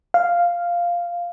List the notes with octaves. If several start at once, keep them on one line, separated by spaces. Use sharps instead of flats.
F5